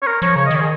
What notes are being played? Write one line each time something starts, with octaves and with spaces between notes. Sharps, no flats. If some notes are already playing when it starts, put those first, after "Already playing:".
C#5
A#4
F3 C#5
C#3 C#5
D#5
D#3
C#5
G#4